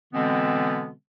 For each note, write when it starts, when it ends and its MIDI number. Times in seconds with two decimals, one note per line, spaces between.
0.13 0.90 47
0.13 0.90 50
0.13 0.90 52
0.13 0.90 56
0.13 0.90 59
0.13 0.90 60